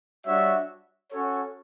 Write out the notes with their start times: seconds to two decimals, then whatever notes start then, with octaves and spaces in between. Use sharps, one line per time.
0.25 G3 D4 F#4 C#5 E5
1.11 C#4 F#4 A4 C#5